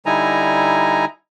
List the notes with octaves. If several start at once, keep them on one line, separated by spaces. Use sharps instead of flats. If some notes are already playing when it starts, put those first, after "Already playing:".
D3 G3 D#4 E4 G#5 A#5